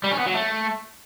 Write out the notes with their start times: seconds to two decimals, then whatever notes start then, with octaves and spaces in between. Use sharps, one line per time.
0.04 G3
0.11 C#4
0.19 B3
0.26 F#3
0.34 A3